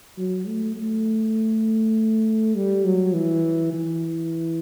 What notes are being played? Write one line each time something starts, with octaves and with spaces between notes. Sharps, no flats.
F#3
A3
A3
G3
F#3
E3
E3